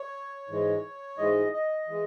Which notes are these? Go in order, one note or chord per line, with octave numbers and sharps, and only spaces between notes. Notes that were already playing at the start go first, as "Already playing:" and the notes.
Already playing: C#5
G#2 E3 G#3
G#2 E3 G#3 D#5
D#5
E3 G#3